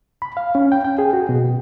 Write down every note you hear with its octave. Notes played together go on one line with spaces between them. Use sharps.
B5
F5
C#4
G5
G5
G#4
F#4
B2